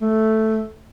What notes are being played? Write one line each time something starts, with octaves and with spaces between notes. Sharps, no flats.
A3